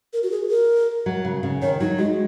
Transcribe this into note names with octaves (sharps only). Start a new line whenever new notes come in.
A#4
F#4
G#4
A#4
F#3
C#3
C#3
D#3 C#5
F#3 D#4
G#3 F#4